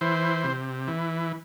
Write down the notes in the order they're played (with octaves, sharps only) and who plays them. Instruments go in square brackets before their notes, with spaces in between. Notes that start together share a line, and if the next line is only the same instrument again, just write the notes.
[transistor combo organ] E3 C5
C3
E3